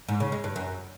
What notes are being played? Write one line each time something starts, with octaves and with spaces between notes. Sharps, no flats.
G#2
C#3
G#3
G2
F#2